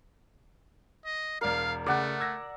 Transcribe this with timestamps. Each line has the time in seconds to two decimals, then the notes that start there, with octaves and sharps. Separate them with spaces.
1.05 D#5
1.41 E1 A#4 D5 F5 C7
1.86 C#3 A3 D5 F#5
2.20 E6 G#6 A#6